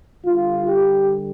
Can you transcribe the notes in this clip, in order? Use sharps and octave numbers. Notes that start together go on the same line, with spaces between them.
D3 G3 F4
G4